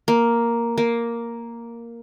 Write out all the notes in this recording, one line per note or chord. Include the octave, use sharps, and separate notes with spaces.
A#3
A#3